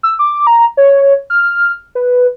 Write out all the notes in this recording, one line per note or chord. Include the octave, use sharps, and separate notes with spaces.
E6
D6
A#5
C#5
F6
B4